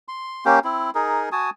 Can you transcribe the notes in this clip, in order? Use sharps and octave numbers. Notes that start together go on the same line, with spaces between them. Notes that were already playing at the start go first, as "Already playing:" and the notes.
C6
A#3 C#4 G4
C4 E4
D#4 G#4 A#4
F#4 G#5 A5 D#6